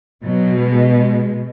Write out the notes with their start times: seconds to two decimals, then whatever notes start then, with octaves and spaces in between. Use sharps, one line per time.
0.23 B2 F#3
0.60 G#3
0.96 G#3